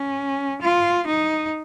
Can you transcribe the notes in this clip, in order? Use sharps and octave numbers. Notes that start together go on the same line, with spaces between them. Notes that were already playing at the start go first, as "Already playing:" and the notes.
Already playing: C#4
F4
D#4